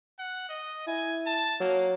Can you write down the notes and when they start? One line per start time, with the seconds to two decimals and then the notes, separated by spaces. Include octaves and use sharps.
0.19 F#5
0.49 D#5
0.87 E4 G#5
1.26 A5
1.60 F#3 A#3